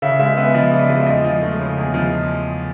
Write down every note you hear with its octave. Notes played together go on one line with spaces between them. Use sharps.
C#3 E5
G#3 E5
B3 E5
F3 D#5
C#3 D5
G#3 D5
E5
E2 D#5
F3
A3
C#3
E2
F3